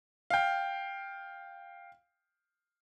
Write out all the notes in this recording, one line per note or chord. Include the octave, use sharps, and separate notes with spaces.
F5 G5